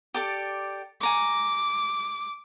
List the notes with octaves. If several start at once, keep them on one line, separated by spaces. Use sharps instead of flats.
G4 A4 D5
G#5 A#5 C#6 D6